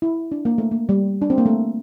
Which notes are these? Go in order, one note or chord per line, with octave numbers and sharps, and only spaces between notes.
E4
D4
A#3
A3
A#3
G3
D4
C4
A#3
A3